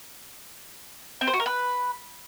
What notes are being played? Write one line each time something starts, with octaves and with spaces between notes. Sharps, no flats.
C4
C5
F#4
A#4
B4